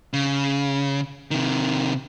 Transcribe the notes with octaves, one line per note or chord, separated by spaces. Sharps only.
C#3
C3 D#3